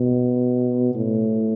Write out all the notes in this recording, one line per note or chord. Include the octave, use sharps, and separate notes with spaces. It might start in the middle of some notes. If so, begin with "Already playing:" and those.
Already playing: B2
A2